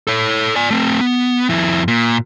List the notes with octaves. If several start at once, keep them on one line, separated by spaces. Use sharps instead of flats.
A4 C#5
D5 G#5
A3 C4
B3
F2 E4
A#2